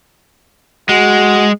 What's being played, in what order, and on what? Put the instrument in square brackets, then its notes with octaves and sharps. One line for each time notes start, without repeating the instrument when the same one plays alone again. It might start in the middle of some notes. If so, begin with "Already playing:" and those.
[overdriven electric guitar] G#3 [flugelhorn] F#4